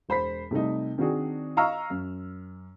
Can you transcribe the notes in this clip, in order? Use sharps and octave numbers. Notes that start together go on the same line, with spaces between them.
E1 C5 B5 B6
C3 G3 A3 D#4
D#3 C4 D4 F#4 G#4
D#5 F5 A#5 C#6 E6 F6
F#2